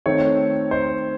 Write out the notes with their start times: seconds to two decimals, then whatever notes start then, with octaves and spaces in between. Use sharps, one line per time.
0.06 D#3 A3 C4 C#5
0.71 C5